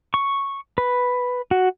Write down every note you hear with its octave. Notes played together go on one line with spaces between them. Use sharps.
C#6
B4
F#4